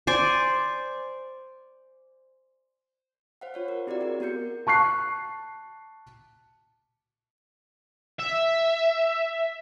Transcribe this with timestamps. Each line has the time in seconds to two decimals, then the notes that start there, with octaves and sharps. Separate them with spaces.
0.07 C5 D5 G#5
3.41 C5 F5 F#5
3.54 F4 C#5 F5
3.68 A#4
3.87 C4 E4 F#4 G4 A#4 D5
4.01 G#4 A#4
4.20 B3 F#4 A#4 G6 C#7
4.67 A5 C#6 F#6 C7
8.19 E5